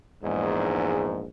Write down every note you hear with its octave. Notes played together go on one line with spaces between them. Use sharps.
A#1 E2 G#2